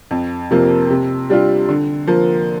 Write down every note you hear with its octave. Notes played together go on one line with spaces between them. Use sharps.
F2
C3 F3 A#3
C3
G3 D4 F4
D3
F3 A#3